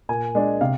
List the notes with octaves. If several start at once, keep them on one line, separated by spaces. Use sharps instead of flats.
A#2 G#5
G#3 D4
C3 F5